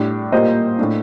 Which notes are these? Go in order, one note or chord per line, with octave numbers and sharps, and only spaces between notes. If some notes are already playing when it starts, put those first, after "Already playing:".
Already playing: A2 G3 D4
A#2 G3 A#3 C5 D#5
A2 A3 D4